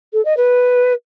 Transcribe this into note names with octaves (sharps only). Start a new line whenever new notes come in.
A4
D#5
B4